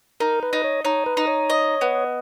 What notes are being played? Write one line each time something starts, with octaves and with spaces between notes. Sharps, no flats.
D#4 A#4
B4
D#4
C#5
D#4 C#5
B4
D#4
C#5
D#5
B3